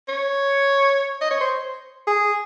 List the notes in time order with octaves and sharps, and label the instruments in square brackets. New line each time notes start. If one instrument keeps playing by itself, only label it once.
[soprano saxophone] C#5
D#5
C#5
C5
G#4